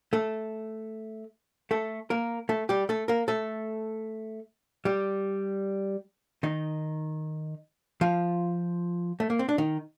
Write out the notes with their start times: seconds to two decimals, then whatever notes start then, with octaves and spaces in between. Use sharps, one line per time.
0.13 A3 A4
1.71 A3 A4
2.10 A#3 A#4
2.49 A3 A4
2.69 G3 G4
2.89 A3 A4
3.08 A#3 A#4
3.28 A3 A4
4.85 G3 G4
6.43 D#3 D#4
8.01 F3 F4
9.20 A3
9.30 A#3
9.39 C4
9.49 D4
9.58 D#3 D#4